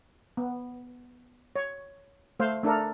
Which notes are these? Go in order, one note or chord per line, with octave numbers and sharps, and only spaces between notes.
B3
C#5
A3 C5 F5
A3 D4 A4 A#4